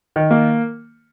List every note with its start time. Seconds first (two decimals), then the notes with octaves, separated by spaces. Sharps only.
0.16 D#3
0.31 A#3